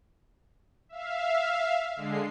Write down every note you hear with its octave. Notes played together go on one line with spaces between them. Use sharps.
E5 F5
D3 G#3 C7